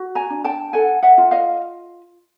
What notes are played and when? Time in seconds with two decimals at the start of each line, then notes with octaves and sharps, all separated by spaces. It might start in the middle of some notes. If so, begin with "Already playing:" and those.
Already playing: F#4
0.15 G#5 A#5
0.30 D4
0.44 G5 A5
0.73 A4 F#5 G#5
1.03 E5 F#5
1.18 F4
1.31 D#5 F5